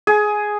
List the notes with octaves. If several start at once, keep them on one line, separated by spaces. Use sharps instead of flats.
G#4